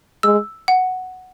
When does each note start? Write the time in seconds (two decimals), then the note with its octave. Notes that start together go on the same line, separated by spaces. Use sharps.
0.23 G#3 E6
0.68 F#5